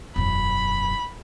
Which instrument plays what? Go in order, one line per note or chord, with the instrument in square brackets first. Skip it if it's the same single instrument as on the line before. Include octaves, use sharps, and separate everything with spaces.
[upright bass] E1 F#2 [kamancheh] B5